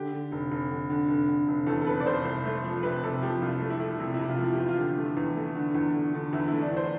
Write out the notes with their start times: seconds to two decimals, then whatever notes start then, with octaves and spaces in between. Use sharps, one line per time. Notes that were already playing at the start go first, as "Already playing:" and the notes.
Already playing: D3 G4
0.13 D3
0.32 F1
0.51 F1
0.71 D3
0.90 D3
1.08 F1
1.29 D3
1.48 F1
1.67 E2 A4
1.81 A4
1.87 F1 B4
2.00 D5
2.06 F1 C5
2.25 C2
2.45 A3
2.64 F3
2.83 C3 B4
3.04 C3 A4
3.22 F3 G4
3.41 C2 F4
3.61 A3
3.70 E4
3.80 A3
4.00 C3 E4
4.14 E4
4.20 C3
4.29 F4
4.39 F3 E4
4.53 G4
4.58 E2 F4
4.68 F4
4.77 D3 G4
4.97 A3 F4
5.17 E2
5.36 A3
5.55 D3
5.75 E2
5.94 D3
6.14 D3
6.33 E2 E4
6.48 A3 E4
6.62 D4
6.71 E2
6.77 C5